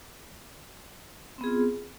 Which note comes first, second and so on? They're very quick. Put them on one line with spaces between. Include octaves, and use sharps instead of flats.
C4 B3 G#4 F4